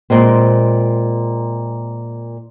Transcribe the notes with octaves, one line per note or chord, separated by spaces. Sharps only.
A#2 G#3 C4